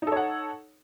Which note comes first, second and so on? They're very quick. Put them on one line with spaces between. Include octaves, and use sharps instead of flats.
D#4 A4 C#5 F#5